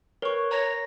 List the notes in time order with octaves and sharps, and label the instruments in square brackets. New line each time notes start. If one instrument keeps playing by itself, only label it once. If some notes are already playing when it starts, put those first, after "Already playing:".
[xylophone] A#4 C#6 [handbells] B4 C#5
[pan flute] C#5 [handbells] A#5 A#6